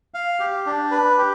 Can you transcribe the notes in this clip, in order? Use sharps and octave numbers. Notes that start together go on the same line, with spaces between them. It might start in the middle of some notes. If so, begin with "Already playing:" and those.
F5
G4
D4
B4
G4